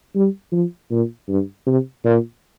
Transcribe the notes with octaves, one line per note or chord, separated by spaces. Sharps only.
G3
F3
A#2
G2
C3
A#2